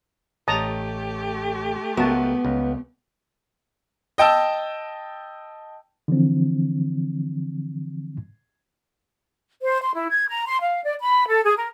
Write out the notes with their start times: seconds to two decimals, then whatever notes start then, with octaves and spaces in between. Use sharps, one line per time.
0.48 A1 A3 G4 C#5 D#5 A5 A#5 D#6
1.97 C#2 B3 F#4 A#4 E5 A5
2.45 C#2
4.18 D#5 G5 A5 E6
6.08 D3 E3 F3 C4
9.62 C5
9.83 C6
9.95 E4
10.09 G#6
10.28 A#5
10.46 C6
10.61 F5
10.83 D5
11.00 B5
11.28 A4
11.45 G#4
11.57 A#4